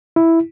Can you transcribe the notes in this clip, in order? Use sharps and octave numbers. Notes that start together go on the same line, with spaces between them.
E4